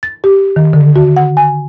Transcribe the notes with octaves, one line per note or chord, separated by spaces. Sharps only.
A6
G4
D#3
D3
F#4
F#5
G#5